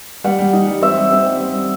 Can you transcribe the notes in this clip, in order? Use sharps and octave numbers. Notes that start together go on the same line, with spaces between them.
G3 F#5
G3
D#4
G3
C4 E5
G3
C4
G3
C4
G3